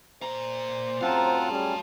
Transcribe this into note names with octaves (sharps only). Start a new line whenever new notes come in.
A#2 C5 A#5
F#2 A2 C4 F4 A#4 F5 F#5 A5
G3 C#4 G#4